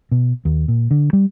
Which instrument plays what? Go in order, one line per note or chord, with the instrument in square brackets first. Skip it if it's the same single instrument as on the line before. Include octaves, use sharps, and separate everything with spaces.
[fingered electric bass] B2
D#2
A#2
D3
G3